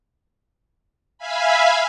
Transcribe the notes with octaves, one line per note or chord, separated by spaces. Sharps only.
E5 F5 G#5 B5